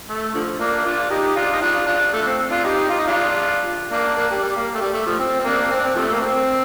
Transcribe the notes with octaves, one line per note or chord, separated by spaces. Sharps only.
A3
D3 F3
A#3 D4
D4 F4
D#4 G4
D4 F4
D#4
D4 F4
D4 F4
A3
D4
C4
D4 F4
D#4 G4
F4
D#4
D4 F4
A#3 D4
A#3 D4
G3
G3
A#3
A3
G3
A3
F3
C4
C4
A#3 D4
C4
D4
C4
C3 F3 A3
A#3
C4